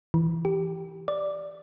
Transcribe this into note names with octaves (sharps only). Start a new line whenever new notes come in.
E3
G4
D5